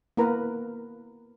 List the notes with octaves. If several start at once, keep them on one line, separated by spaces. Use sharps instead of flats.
A#3 B3 E4 A#4 B4 A#5